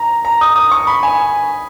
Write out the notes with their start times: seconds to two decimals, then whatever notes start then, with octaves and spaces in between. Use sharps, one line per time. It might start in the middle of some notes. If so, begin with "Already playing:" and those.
Already playing: A#5
0.25 A#5
0.41 D#6
0.56 D#6
0.72 C#6
0.87 B5
1.03 G#5